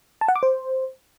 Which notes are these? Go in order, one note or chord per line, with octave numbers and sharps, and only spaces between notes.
A5
F#5
D6
C5